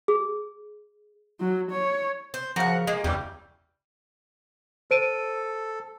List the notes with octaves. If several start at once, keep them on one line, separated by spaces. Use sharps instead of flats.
G#4
F#3
C#5
C5
C#3 F3 F#4 A#4 F5 F#5
G#3 A#3 G#4
E2 C#3 E3 G3 G4
A4 C5 D7 D#7